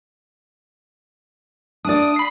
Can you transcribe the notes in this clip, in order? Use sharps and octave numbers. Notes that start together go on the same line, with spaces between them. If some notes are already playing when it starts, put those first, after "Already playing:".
D4 D5 D#6
B5 C7